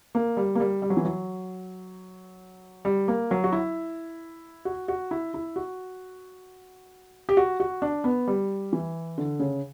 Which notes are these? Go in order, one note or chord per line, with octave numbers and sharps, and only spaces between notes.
A#3
G3
A#3
G3
G3
F#3
E3
F#3
G3
A#3
F#3
F#4
E4
F#4
F#4
E4
E4
F#4
G4
F#4
F#4
D4
B3
G3
E3
D3
C#3